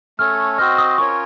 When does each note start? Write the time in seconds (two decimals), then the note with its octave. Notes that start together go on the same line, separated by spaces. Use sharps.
0.18 A3 C#4 A4 C#5 F6
0.58 C4 F#4 C5 D#5 F6
0.78 D#6
0.97 C#4 F4 A#4 C#5 C#6